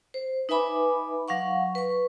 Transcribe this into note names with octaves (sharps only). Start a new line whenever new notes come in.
C5
D#4 B4 E5 G#5 B5 D6
F#3 F5 F#5 C#6
B4 C#6